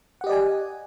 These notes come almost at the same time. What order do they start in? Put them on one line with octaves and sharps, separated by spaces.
F#5 G4 D#5 D5 G#5